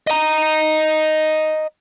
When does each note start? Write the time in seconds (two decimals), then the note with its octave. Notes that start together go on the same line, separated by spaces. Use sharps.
0.07 D#5 A#5